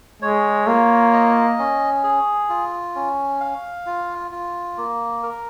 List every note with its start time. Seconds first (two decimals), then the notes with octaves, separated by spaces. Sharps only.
0.22 G#3 C#5
0.67 A#3 F4
1.13 D#5
1.58 C#4
2.04 G#4
2.50 F4
2.95 C#4
3.41 F5
3.86 F4
4.31 F4
4.77 A#3
5.23 A#4